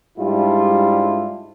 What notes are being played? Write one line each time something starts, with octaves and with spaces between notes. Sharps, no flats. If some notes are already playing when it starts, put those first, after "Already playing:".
G#2 G3 D4 E4 F4